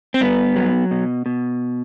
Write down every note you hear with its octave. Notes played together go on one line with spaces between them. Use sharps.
C4
G2 B3
F#3
B2
B2